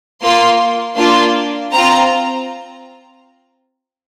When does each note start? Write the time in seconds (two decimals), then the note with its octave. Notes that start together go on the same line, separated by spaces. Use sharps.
0.22 A#3 F4 C6
0.96 A#3 D4 F4 C6
1.71 C4 F4 A#5